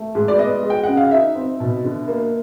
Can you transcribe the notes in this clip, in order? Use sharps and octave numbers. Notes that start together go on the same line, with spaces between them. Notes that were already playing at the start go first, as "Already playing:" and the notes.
Already playing: A3
G#2
D5
B3 D#5
G#3
G5
C#3 F#5
F5
D#4 E5
C4
B2
D3
A#3